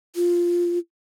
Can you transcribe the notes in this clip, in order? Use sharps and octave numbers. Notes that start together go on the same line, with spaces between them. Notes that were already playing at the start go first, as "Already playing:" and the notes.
F4